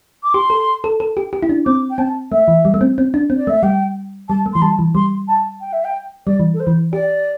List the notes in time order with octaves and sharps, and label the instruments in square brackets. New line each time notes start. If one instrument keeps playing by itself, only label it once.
[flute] D6
[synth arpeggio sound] G4 [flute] C6
[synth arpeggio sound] A4
A4
A4
G4
G4
E4
D4
[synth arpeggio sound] C4 [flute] D6
[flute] G5
[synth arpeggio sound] C4 [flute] A5
[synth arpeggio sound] A3 [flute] E5
[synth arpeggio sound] E3
G3
A3
C4
C4
D4
C4
[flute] D5
[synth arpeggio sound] A3 [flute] E5
[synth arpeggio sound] G3 [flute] G5
[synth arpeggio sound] G3 [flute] A5
[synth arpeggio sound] A3
[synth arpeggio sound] E3 [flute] C6
[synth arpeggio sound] G3 [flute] A5
[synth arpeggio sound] E3
[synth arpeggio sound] G3 [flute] C6
[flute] A5
G5
E5
G5
[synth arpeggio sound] G3 [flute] D5
[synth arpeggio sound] E3
[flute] A4
C5
[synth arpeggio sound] E3
[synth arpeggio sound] G4 [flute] D5